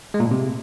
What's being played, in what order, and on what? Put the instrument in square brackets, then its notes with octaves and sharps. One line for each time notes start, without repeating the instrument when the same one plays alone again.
[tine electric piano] G#3
A#2
A2
C3